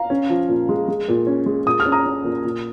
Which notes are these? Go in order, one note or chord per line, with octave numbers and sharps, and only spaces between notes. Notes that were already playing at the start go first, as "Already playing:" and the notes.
Already playing: F5 A#5
C#4
F3
A#2
G#3
G#3
A#2
C#4
G#3
A#2 D#6
F6
C#4
A#5 D#6
C#4
A#2
A#2